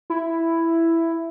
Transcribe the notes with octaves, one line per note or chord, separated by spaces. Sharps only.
E4